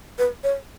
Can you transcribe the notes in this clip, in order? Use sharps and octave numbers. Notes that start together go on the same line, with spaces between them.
B4
C#5